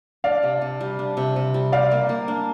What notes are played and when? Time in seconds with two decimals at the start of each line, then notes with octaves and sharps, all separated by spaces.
0.24 D4 D5 F5
0.43 C3
0.61 C3
0.81 G3
0.99 D4
1.17 C3
1.36 C3
1.54 G3
1.72 G4 D5 F5
1.91 A#3
2.09 A#3
2.28 D4